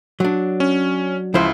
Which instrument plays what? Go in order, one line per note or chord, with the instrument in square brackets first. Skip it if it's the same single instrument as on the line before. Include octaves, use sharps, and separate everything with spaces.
[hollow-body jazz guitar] F#3 D4
[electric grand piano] C#4
[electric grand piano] C#2 E4 [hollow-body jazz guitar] F3 C5